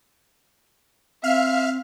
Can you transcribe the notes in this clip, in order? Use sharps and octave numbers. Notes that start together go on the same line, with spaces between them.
C4 E5 F5 F6